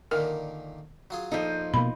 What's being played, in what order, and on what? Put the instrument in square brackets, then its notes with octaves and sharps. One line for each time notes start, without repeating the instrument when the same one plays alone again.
[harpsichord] A#2 D3 D#3 [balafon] A#4
[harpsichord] F#3 F4 G#4
[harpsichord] A#1 A4 [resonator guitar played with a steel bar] F3 D#4
[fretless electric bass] B2 A#3 [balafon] B5